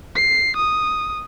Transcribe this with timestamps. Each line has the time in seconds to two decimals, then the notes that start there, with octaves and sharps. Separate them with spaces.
0.15 C7
0.57 D#6